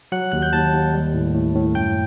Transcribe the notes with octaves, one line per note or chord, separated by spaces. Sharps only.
F#3 F#5 F#6
D#2 F#6
G6
D#2 A5 A6
D#2
G3
A2
A2
A2
F#2 G5 G6